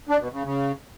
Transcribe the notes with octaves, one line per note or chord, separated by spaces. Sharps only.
D4
B2
C#3
C#3